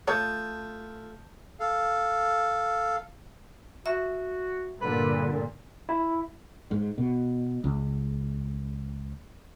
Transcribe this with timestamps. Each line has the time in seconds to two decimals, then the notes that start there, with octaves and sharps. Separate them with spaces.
0.08 A3 F4 C#5 A5 D#6 G6
1.60 A4 F5
3.86 F#4 E5
4.81 G2 A#2 D3 B4
5.89 E4
6.71 G#2
6.98 B2
7.64 C#2